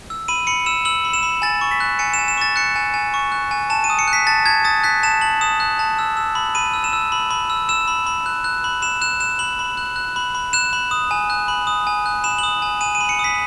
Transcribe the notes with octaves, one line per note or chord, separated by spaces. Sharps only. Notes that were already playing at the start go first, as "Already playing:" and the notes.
E6
B5 D#7
B5 C#7
E6 E7
E6 F#7
B5
E7
B5
G#5 A6
C#6
B6
F#6
G#5 C#7
E7
G#5
E7
C#6 A6
F#6 C#7
G#5
G#5
C#6
F#6
G#5
A5 E7
D#7
D#6
C#7
F#6
B6
A5 A6
A5 G#6
D#6 A6
F#6 B6
A5 E7
A5 F#7
D#6 E7
F#6
A5
E6
E6
B5
B5 D#7
E6
E7
E6
B5
B5
E6
E6 E7
B5
B5
F#6
F#6
B5
B5 E7
F#6 E7
F#6 E7
B5 F#7
B5
F#6
F#6
B5
B5
F#6 E7
B5
D#6
G#5
F#6
B5
D#6
G#5
F#6
B5 E7
D#6 F#7
G#5
G#5 D#7
D#7
B5
C#7
D#6
B6